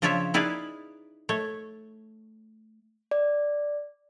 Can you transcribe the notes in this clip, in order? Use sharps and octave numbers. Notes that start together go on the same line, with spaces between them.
C#3 F3 D4 F4 C#5 E5
D#4 E4 G#4 B4 D5 F5
A3 C#5
D5